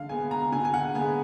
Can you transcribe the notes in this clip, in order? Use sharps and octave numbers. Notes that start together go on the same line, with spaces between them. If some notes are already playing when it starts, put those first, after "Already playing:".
Already playing: D3 F5
G#3 B3 G#5
A#5
D3 G#5
G#5
F#5
G#3 B3 G#5